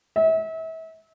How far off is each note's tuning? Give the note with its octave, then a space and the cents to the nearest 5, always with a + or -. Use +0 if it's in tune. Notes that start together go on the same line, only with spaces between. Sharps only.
E5 -35